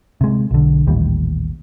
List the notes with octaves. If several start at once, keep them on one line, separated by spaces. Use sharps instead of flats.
C3 G#3
B1 D3
D#1 A1 D#2 G3